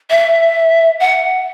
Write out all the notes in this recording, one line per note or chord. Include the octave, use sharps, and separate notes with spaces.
E5
F#5